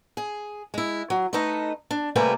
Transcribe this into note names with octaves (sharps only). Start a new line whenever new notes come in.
G#4
G#3 E4
F#3
A3 D#4 A4 B4 D#5
D4
C3 G3 A3 A#3 B4 G#5